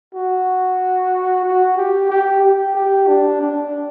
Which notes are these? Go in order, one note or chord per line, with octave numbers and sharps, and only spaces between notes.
F#4
F#4
G4
G4
G4
G4
D4
D4